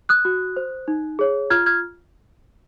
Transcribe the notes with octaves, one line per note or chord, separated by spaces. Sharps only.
D#6 F#6
F#4
C5
D#4
G#4 C#5
F4 F6 G#6
F6 G#6